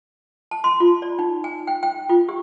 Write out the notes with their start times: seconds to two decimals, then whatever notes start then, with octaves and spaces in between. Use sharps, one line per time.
0.51 A5
0.64 C6
0.80 F4
1.02 D5
1.19 D#4
1.44 G#5
1.67 G5
1.83 G5
2.09 F4
2.29 G4